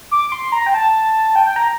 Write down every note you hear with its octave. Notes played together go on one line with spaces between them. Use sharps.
D6
C6
A#5
G5
A5
G5
G5
A#5